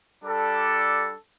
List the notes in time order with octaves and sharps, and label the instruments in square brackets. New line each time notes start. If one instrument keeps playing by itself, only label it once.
[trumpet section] G3 D4 A4